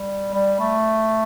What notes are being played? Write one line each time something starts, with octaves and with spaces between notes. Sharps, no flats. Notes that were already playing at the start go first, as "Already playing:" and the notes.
Already playing: G3
G3
A3